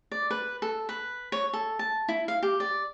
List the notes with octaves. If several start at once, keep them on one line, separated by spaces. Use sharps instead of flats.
D5
B4
A4
B4
C#5
A4
A5
E4
F5
G4
D5